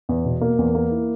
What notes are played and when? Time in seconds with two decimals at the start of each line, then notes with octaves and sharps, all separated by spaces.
0.09 E2
0.25 B2
0.41 A#3
0.59 E2
0.75 A#3
0.91 E4